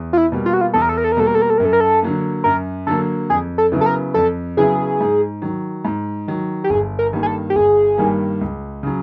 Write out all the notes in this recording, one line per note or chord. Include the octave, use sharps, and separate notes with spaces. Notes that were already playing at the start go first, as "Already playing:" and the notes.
Already playing: E2
F4
E4
B2 G3 A#3
F4
F#4
F4
E2 A4
A#4
A4
A#4
A4
A#4
B2 G3 A#3 A4
A#4
A4
A#4
A4
F#2 A#4
A4
A#4
A4
D3 F#3 A#3
F#2 A#4
D3 F#3 A#3 A4
F2 G#4
A4
C#3 F#3 B3 E4
A4
A#4
F2 A4
C#3 F#3 B3 E4 G#4
G#2
D#3 F#3
G#2
D#3 F#3
G4
G1 G#4
A#4
G2 D#3 G3 A#3
G#4
A4
G4
G1 G#4
G2 D#3 G3 A#3
C#2
C#3 F#3